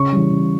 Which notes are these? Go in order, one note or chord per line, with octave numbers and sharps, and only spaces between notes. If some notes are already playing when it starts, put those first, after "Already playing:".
Already playing: C#3 C#6
E3 G3
C#3